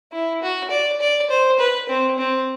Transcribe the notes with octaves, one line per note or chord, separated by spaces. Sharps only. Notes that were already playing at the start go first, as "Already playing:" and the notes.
E4
F#4
D5
D5
C5
B4
C4
C4